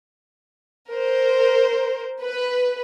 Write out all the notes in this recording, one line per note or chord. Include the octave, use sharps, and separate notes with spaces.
A#4 C5
B4